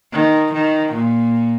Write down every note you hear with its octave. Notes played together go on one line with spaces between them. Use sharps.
D#3
D#3
A#2